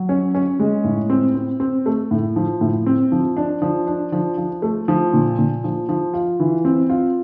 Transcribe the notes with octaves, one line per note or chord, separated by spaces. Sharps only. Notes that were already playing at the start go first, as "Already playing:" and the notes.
Already playing: F#3
C#4
C#4
G#3
A2
C4
C4
C4
A3
A2
F3
A2
C4
F3
D4
F3
D4
F3
F3
A3
F3
A#2
A#2
F3
F3
F4
E3
C4
F4